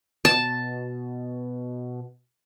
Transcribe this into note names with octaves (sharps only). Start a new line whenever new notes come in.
B2 A5